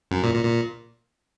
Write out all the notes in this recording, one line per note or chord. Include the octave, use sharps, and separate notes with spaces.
F#2
A#2
A#2
A#2